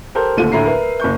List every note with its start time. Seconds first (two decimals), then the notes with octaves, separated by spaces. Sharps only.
0.15 G4 A4 A#4 C5 G6
0.37 D#1 D#2 D3 A3 F4 D#7
0.52 D2 A2 A3 E5 A#5 C7
0.66 A#4 B4 E5
1.00 F#1 A#4 C#6 G6